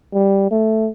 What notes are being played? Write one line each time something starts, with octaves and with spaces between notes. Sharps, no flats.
G3
A3